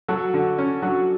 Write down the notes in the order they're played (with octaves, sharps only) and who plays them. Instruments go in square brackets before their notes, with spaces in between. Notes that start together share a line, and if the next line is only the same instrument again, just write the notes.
[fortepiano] F#3 [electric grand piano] F#4 A4
[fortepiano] D3
C#4
[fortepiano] F#3 [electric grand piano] D4 F#4